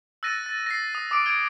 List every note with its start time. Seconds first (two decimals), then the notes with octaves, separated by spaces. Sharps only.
0.23 E6 F#6 A6 A#6 D#7
0.46 A6
0.66 A#6 C7
0.95 D#6
1.11 D6 D#6 D7
1.25 D6 G#6 D7 G7